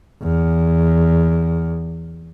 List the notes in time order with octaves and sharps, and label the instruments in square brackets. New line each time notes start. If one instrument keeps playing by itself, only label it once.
[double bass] E2